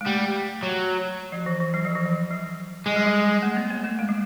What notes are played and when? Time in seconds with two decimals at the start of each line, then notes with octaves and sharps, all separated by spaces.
0.01 G#3
0.05 G3 A3
0.63 F#3
1.32 F3
1.46 E3
1.60 E3
1.74 F#3
1.85 F3
1.95 E3
2.06 F3
2.30 F#3
2.86 G3 G#3
2.96 F#3
3.06 G3
3.42 A3
3.57 B3
3.70 A#3
3.84 A3
3.99 G#3
4.09 G3